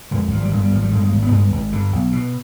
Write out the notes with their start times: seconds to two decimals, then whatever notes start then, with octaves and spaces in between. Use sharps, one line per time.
0.11 F2 D3 G#3
0.31 G#1 F3
0.42 G3
0.51 G2 D3 G#3
0.61 G3
0.71 G#1 F3
0.82 G3
0.92 G2 D3 G#3
1.03 G#3
1.12 G#1
1.23 B3
1.32 G2 D3 G#3
1.52 G#1
1.72 G2 D3
1.93 B1
2.12 B2